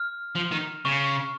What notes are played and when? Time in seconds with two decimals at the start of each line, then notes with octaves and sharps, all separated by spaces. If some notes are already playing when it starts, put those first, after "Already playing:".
Already playing: F6
0.35 F3
0.51 D#3
0.85 C#3 C#6